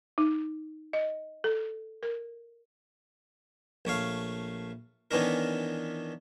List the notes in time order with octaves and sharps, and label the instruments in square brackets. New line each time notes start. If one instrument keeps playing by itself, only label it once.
[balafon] D#4
D#5
A4
A#4
[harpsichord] A#1 A3 C#5 F5
D#3 E3 B3 C#4 D4 A#4